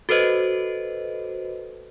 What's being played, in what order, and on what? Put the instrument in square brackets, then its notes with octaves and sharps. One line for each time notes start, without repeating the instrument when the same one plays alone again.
[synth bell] F#4 A4 B4 C5 D#5